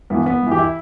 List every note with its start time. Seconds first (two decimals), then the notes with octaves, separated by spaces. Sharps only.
0.10 G2 E3 B3
0.26 B3
0.42 G2 E3
0.51 G4
0.58 E4